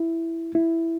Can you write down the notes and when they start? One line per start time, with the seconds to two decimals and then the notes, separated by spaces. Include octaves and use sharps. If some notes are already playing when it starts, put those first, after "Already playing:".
Already playing: E4
0.55 E4